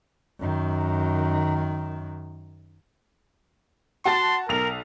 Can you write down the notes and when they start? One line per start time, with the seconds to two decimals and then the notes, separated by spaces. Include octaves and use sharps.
0.40 F#2 D#3
4.05 F#4 A5 C6 A6
4.49 B1 A#4 F7